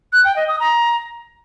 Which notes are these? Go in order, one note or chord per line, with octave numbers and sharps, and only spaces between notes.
F#6
G5
D#5
D#6
A#5